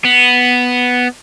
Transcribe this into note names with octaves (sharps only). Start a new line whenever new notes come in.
B3